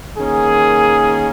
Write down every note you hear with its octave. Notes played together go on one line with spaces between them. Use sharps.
D#3 A#3 C#4 G#4